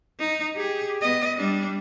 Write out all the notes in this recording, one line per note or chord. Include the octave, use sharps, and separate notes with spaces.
D#4
G4 G#4
B3 D#5
G3 D4